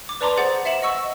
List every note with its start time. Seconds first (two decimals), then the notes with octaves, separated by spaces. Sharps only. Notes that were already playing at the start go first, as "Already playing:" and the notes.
0.09 D6
0.21 B4 D5 A5 A#5 C6 D6
0.37 G#4 C5 F#5 A6
0.65 E5 F#5 E7 F#7
0.82 D#5 F#5 C#6 E6